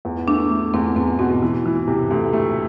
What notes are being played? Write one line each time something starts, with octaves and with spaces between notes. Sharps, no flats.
E2
A3 D4
A3
E2 C4
E2 C4
B2 C4
E3
E3
C3
D2
A3